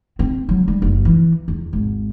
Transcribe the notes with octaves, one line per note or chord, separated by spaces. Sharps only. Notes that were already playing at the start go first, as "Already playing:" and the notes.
C4
F#3
G3
F#1
E3
E2
G#1